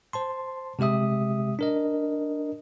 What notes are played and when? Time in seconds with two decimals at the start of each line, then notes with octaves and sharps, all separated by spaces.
0.13 C5 A5 C6
0.79 C3 G#3 G4 E5 D#6
1.59 D4 A#4 D#5